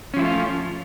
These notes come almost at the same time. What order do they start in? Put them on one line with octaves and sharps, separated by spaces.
C#4 F3 E4 A3 F4